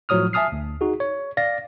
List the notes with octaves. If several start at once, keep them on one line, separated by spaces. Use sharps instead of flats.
A2 F3 F#3 C#5 D#6 F6
E5 G#5 A5 D#6 F6 C7
D2
D#4 F#4 G#4
C#5
D5 F5 A6 A#6